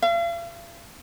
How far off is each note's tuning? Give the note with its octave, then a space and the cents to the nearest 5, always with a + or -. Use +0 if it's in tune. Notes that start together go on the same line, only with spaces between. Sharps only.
F5 -45